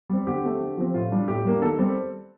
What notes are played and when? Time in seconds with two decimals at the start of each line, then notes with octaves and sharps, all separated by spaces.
0.09 G3 C4
0.27 D3 G4
0.44 A3 C4
0.61 D3
0.77 F3 C4
0.94 A2 F4
1.11 G3 D4
1.28 A2 G4
1.45 G3 A#3 D4
1.62 D#3 A4
1.78 G3 C4